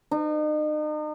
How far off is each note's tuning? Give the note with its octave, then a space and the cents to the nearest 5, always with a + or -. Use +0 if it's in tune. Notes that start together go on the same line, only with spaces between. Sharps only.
D#4 -40